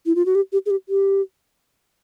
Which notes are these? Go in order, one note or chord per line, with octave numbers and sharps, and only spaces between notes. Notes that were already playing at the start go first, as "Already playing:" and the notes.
E4
F4
F#4
G4
G4
G#4
G4
G4